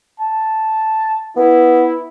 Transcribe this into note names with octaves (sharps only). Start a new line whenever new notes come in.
A5
B3 E4